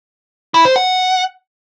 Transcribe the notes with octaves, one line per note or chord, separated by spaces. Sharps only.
E4
C5
F#5